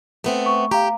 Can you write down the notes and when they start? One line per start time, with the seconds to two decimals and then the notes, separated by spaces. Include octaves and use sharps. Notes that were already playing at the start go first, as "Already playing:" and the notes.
0.24 A3 B3 C4
0.46 C#6
0.71 G4 F5 A#5